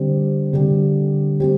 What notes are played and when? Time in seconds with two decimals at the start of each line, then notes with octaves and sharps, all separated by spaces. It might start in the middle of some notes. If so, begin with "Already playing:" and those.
Already playing: D3 G3 C4 G4
0.53 D3 G3 C4 G4
1.40 G3 C4 G4